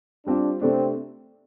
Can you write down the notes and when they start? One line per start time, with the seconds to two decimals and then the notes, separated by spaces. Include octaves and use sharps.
0.26 G3 C4 D4 F4
0.61 C3 A3 C4 D4